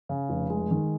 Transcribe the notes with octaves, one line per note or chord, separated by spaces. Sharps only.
C#3
F1
G#3
D#3